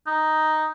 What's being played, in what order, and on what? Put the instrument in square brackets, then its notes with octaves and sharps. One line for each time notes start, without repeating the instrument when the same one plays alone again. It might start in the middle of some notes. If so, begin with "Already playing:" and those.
[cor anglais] D#4